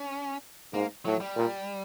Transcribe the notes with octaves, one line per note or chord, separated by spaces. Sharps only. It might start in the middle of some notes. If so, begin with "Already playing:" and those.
Already playing: C#4
G#2 A#3
A2 F#3
G3
A#2